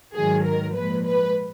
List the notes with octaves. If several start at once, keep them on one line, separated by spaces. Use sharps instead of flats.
G#2 D#3 F#3 G#4
A#4
A#2 F3 G#3 B4
B4